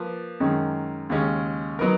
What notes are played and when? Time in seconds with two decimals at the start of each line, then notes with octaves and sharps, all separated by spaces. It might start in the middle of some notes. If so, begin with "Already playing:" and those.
Already playing: F3 A#3 F4 B4
0.40 F#2 D#3 G#3 C#4
1.10 D#2 C#3 G#3 C#4
1.79 F#3 B3 D#4 A#4